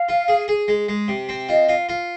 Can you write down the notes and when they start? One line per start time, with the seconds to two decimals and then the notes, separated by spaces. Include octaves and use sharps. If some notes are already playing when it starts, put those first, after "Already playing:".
Already playing: F5
0.09 F4
0.28 G#4
0.48 G#4
0.68 G#3
0.88 G#3
1.08 C3
1.29 C4
1.49 F4 D#5
1.69 F4
1.89 F4